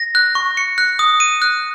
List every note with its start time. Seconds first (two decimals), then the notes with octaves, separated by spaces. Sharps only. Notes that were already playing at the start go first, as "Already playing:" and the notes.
Already playing: A#6
0.15 F#6
0.35 C#6
0.57 C#7
0.78 F#6
0.99 D#6
1.20 D#7
1.42 F#6